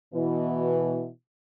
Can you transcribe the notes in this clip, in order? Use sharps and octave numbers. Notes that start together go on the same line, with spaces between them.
B2 E3